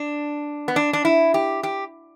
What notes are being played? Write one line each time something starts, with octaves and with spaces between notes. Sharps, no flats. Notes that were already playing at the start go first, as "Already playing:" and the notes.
Already playing: D4
B3
D4
D4
E4
G4
G4